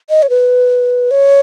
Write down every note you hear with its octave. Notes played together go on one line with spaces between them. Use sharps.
D#5
C#5
B4
C#5